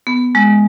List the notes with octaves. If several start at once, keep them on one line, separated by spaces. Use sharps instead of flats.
B3
G#3